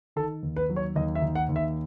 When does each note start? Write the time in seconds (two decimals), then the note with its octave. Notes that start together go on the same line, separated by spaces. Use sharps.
0.16 D#3 A4
0.42 D#2
0.56 B4
0.70 F#3
0.76 C#5
0.95 D#2 D#5
1.15 E5
1.22 D#3
1.35 F#5
1.49 D#2
1.56 E5